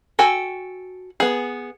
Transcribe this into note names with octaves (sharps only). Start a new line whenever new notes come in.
F#4 A4 G5 G#5
B3 G#4